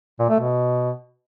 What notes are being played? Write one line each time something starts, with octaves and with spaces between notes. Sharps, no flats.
A#2
A3
B2